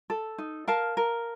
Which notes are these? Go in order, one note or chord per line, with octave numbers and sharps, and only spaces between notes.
A4
D#4
A#4 F5 A5
A#4